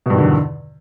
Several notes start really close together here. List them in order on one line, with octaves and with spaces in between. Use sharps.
B2 G2 D#3 D3 E2